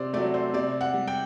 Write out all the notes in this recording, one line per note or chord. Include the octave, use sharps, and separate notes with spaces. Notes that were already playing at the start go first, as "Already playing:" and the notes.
Already playing: C3 C5 D5
F#3 A3 D5
C5
C3 D5
F#5
G3
G5